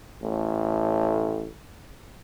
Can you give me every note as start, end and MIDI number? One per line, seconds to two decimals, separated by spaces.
0.22 1.51 33
0.22 1.51 45